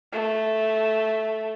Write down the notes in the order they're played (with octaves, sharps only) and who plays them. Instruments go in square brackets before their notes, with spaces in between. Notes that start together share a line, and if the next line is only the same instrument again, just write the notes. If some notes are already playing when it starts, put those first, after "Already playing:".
[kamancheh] A3